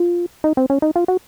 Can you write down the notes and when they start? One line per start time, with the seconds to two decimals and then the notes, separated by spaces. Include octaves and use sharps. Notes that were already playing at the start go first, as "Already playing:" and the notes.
Already playing: F4
0.44 D#4
0.57 C4
0.70 C#4
0.82 D#4
0.96 F4
1.08 F#4